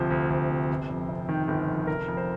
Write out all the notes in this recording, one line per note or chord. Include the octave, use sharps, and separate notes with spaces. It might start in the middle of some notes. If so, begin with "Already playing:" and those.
Already playing: D2 C3 F3 C5
D2
D2
C3
G1
F2
C3
D#3 G5
G1
F2
F1 A#4
F2
C5